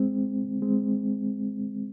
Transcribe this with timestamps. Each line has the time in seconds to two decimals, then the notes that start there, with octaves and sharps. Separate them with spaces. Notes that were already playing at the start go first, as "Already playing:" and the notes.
Already playing: G#3 C4
0.62 G#3 C4